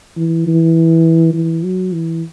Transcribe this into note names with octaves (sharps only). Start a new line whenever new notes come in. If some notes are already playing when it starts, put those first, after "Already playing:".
E3
E3
E3
F#3
E3